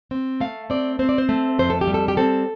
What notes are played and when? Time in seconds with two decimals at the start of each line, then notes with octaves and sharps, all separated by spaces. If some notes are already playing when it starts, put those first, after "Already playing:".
0.11 C4
0.40 A3 F5
0.70 C4 D5
0.99 C4 C5
1.09 D5
1.18 C5
1.29 A3
1.59 F2 C5
1.70 A4
1.81 G4
1.88 G3
1.94 A4
2.08 G4
2.17 C4 A4